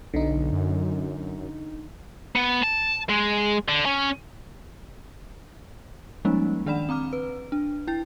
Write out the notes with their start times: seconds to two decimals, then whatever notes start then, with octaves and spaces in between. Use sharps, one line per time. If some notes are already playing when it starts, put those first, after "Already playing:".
0.14 B1 D3 D#4
0.52 F#2
2.36 B3
2.64 A5
3.10 G#3
3.68 D3
3.86 C#4
6.25 F3 G3 G#3 A#3 C#4 D#4
6.66 D#3 D4 D5 F#5 B5 E7
6.89 C4 A#5 D6 F6
7.13 B4
7.52 D4
7.87 E4 G5 A6